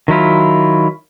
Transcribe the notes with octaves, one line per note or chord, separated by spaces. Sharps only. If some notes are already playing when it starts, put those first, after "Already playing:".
D#3 F#3 E4 F4